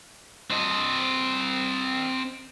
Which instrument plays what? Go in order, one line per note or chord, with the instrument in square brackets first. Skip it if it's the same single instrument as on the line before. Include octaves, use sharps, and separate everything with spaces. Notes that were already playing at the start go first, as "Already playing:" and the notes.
[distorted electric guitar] C4 D#5